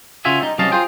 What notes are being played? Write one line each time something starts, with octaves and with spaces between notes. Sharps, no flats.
C#3 F4 F#4 E5 G#5
G3 D#4
C2 F#3 C#4 D#5 F5 A5
F4 G#4 C5 G5